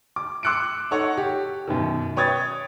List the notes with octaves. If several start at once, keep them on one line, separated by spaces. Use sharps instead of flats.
D6
C6 D6 E6 F#6 C#7 D7
D#4 A4 C#5 F#5
G4
F#2 B2 D#3
B4 C#5 G5 D#6 G#6 A6